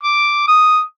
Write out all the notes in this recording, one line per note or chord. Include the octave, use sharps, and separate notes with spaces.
D6
D#6